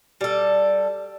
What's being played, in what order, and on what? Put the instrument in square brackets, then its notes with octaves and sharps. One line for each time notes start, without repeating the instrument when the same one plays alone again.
[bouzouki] G3 A4